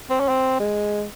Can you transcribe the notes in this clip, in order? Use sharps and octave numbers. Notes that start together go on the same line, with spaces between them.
C4
C#4
C4
G#3